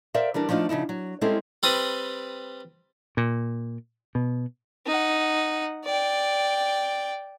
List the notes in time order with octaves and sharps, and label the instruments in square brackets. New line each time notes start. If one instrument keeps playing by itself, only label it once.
[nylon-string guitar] A#4 C5 D5 E5 F5
E3 G3 D4 A#4
F3 A3 D4 D#4 F4
C#3 F3 D#4 E4
F#3
G3 G#3 C4 C#4 E4 A4
[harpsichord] G3 C4 B4 D#6
[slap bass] A#2
B2
[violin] D#4 F#5
D5 G5